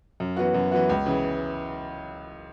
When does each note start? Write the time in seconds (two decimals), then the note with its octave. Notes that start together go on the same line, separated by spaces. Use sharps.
0.20 F#2
0.36 E3 B3 F#4
0.54 F#2
0.71 E3 B3 F#4
0.89 C#2
1.06 C#3 E3